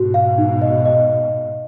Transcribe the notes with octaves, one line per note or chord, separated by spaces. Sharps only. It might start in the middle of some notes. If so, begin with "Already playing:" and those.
Already playing: G#2 B2 F#4
F5
D#4
D#5
D#5